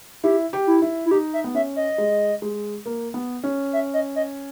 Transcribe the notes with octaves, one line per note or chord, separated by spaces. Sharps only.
E4 G4
G4
E4
E4
E4
D#4 G4
E5
B3
C#4 E5
D#5
G#3
G#3
A#3
B3
C#4
E5
D#5
D#5